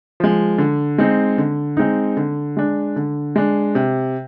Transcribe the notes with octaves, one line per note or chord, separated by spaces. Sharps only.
F3 G#3
D3
G#3 C4 D#4
D3
G#3 C4 D#4
D3
G#3 D4
D3
G#3 D4
C3